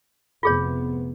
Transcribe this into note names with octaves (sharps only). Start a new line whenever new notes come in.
F1 C3 B3 F4 G#4 C#5